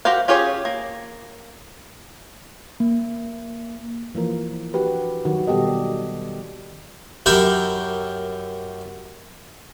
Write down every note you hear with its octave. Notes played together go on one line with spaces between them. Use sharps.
F#4 G4 A#4 C5 F5
C#4 F4 G4 G#4 C#5
A#3
A#3
E3 F3 A#3 A#4
D4 F#4 G4 B4
D#3 F#3 F#4
B2 G3 B3 G4 A4 D#5
D#3 D5
F#2 E4 G4 A#4 B5